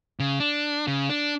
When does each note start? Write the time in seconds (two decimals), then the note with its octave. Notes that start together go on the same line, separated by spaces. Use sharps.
0.20 C#3
0.40 D4
0.87 C#3
1.10 D4